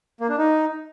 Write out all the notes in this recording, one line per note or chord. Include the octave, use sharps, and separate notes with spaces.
A#3
D4
D#4